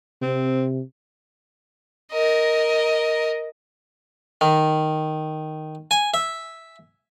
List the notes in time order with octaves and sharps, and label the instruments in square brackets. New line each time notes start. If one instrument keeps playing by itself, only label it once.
[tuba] C3 [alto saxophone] C4
[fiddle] A#4 D#5
[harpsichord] D#3
G#5
E5